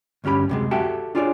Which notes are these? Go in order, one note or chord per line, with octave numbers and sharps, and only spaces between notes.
D2 G2 C#4 G4 B5
F#2 C3 G#3
F#4 G4 A4 E5 G5
D4 F4 G#4 C#5 D5